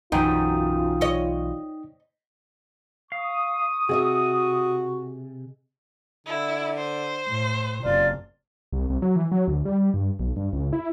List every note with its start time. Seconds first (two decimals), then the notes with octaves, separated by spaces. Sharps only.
0.12 B1 F#2 E3 D#4 F4 G5 D#6
1.01 C#5 D#5
3.12 F5 C#6 D#6
3.89 C3 F#4 G#4 D#5 E5
6.26 D3 E4
6.77 C5
7.28 A2
7.84 F#1 C3 F4 D5
8.72 C2
8.90 C2
9.02 F#3
9.16 E3
9.32 F#3
9.48 D2
9.65 G3
9.94 G2
10.19 B1
10.36 G2
10.53 C#2
10.73 E4